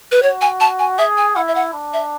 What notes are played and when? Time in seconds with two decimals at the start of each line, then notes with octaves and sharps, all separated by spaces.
0.12 B4
0.22 F#4 C#5
0.41 G#5
0.60 A5
0.79 G#5
0.98 G#4 E5
1.17 G#5
1.36 E4 F#5
1.48 E5
1.55 F#5
1.74 D4
1.93 E5